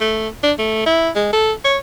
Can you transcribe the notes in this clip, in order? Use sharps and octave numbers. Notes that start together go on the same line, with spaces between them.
A3
D4
A3
E4
G#3
A4
C#5